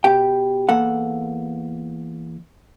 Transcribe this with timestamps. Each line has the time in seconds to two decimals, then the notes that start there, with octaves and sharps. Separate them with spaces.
0.04 B2 G4 G5
0.69 E2 A#3 A4 F#5